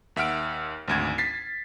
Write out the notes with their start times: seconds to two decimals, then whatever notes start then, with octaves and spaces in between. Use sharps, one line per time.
0.16 D#2 E5 F#5 F6 D7
0.88 G#1 D2 G#6
1.18 A6 B6 C7